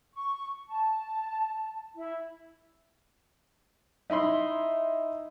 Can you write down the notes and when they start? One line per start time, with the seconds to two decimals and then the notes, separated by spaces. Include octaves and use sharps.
0.14 C#6
0.68 A5
1.96 E4
4.10 D#4 E4 B5 C6